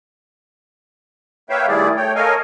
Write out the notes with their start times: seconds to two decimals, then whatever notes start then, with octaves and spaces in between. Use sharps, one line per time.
1.50 A#3 B4 C#5 E5 F5 G5
1.67 D#3 G3 A3 E4 G#4 D5
1.97 A3 C#5 G5
2.15 A4 A#4 C#5 D#5 F5 G#5